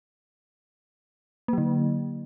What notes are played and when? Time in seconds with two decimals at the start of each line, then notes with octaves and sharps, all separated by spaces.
1.48 A#3
1.53 F#3
1.58 D3